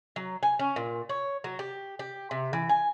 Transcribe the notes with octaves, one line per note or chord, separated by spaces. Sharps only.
F#3
G#5
C#4
A#2
C#5
F#3
G4
G4
C3
E3
G#5